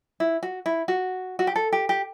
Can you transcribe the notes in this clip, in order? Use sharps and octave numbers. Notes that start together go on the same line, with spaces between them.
E4
F#4
E4
F#4
F#4
G4
A4
G4
G4